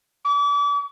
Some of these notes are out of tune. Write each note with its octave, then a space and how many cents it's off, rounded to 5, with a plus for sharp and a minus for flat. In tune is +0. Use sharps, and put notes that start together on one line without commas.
D6 -40